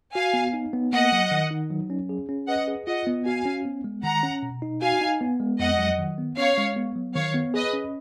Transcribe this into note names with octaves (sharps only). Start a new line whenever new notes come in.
F#4 F5 G#5
B3
D#4
B3
A#3 D#5 F#5
F#3
D#3
D#4
F#3
C#4
G#4
C#4
B4 D#5 F#5
G#4
F4 D#5 F#5
B3
F#4 F5 G#5
C#4
B3
G#3
D#3 F#5 A#5
C#4
B2
D#4
F#4 F5 G#5
D#4
B3
G#3
F2 D#5 F#5
F#3
D#3
B3
C#4 C#5 F5
G#3
B3
F#3
D#3 C#5 F5
B3
G#4 B4 D#5
C#4